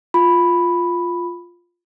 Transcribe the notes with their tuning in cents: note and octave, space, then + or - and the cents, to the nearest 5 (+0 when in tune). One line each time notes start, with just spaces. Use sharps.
F4 +5 B5 +0